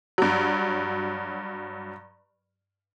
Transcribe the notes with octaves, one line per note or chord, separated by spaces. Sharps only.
G2 F#3